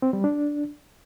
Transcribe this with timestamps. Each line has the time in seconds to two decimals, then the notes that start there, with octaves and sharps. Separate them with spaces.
0.02 C4
0.13 G3
0.24 D4